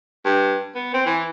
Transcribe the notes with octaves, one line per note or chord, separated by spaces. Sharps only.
G2
B3
C4
E3